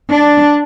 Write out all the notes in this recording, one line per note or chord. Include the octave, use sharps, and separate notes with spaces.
D4